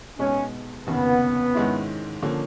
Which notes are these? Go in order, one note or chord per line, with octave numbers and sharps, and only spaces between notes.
B1 B2 G#3 C#4
F1 D#2 C#3 B3
G#2 D#3 G#3 C#4 E4
D3 F3 A#3 C#4